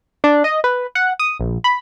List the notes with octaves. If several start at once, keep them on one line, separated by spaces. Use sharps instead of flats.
D4
D#5
B4
F#5
D#6
A#1
B5